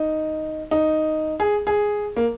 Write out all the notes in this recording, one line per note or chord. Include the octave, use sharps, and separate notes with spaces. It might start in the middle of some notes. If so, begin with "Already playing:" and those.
Already playing: D#4
D#4
G#4
G#4
A#3